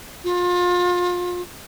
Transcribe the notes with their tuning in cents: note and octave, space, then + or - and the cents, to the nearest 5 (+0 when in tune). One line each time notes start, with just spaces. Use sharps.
F4 +30